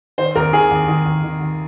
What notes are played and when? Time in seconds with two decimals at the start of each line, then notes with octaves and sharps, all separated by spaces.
0.18 D#3 C5
0.35 D#2 A#4
0.53 D#3 G#4
0.71 D#2
0.88 D#3
1.06 D#2
1.23 D#3
1.41 D#3